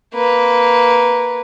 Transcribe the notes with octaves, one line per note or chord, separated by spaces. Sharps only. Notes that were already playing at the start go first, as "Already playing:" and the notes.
A#3 B4